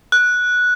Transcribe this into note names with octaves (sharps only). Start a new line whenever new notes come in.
F#6